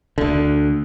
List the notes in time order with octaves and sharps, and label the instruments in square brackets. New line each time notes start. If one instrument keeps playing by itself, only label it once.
[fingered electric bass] D2 D3